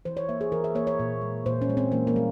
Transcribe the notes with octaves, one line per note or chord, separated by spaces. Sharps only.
E3 C5
C#5
A#3 E5
G#4
E3 A#4
E5
A#3 C#5
C#5
A#2
G#3
A#2 C5
C#4
G#3
C4
E3 A#3
A#3
G3